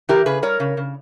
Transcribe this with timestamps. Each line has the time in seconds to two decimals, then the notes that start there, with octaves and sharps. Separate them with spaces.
0.09 E3 G4 A#4
0.26 C#3 G#4 B4
0.42 G3 A#4 C#5
0.60 C#3
0.77 C#3